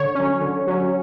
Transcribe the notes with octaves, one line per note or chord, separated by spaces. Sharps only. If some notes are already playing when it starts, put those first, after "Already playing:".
Already playing: D3 C#5
F#3 C#4
D3
F#3 C#4